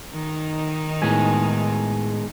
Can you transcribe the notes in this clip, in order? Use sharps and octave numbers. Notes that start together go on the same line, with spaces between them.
D#3 D#4
A2 G#3 B3 G#4 G#5